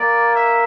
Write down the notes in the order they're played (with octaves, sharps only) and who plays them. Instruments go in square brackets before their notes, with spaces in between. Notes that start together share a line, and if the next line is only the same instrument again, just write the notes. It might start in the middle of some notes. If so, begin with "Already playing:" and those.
Already playing: [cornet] A#3 [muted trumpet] D5
[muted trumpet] E5